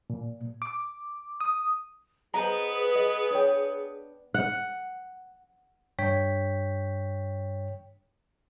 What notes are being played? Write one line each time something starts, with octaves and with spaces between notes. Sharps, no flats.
A#2
D6
D#6
B3 G#4 B4 C5 D#5 A#5
D#5
D4 C#5 G5
F#5
G2 C#5 G5 B6